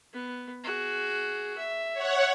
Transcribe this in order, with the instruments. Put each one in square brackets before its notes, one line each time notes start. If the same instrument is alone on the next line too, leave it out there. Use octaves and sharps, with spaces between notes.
[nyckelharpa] B3
F#4 G#4
E5
[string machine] C#5 F#5